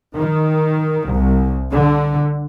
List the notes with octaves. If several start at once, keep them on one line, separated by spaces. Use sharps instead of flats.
D#3
C2
D3